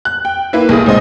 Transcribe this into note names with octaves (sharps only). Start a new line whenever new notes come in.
F#6
G5
A#3 E4 B4 E5
B1 G#4 D#6
C#2 A#2 C4 D#5